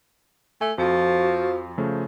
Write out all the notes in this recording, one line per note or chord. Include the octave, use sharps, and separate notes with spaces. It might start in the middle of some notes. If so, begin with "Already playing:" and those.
A3 G#5
F2 F3 F#4
C#3 F3 A3